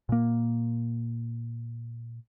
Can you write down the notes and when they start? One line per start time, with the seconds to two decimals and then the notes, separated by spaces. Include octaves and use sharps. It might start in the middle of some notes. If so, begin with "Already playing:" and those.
0.09 A#2 A#3